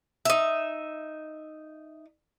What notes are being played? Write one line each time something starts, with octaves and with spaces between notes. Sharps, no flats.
D#4 E5